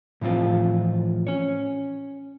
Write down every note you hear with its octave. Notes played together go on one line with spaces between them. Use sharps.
A2 E3 F3 C4 F4
C#4 C#5